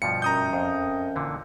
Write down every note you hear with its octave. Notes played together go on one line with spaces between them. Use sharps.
G2 B2 F3 C#7
F#2 A#5 D#6 G6
F2
A#2 D3 E3